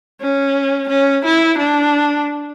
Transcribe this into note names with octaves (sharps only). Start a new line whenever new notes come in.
C#4
C#4
E4
D4